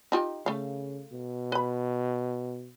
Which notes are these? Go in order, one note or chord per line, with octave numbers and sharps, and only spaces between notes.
D#4 F4 G4
C#3 A3 F5
B2
B4 B5